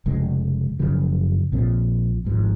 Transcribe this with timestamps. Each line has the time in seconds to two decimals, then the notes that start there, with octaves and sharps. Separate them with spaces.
0.06 F1 F2 C#3 G#3
0.79 F#1 F#2 C#3 F3
1.52 A#1 A#2 F3 C4
2.25 G#1 G#2 F3